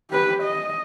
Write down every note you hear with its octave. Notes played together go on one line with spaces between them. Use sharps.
G4 B4
D#5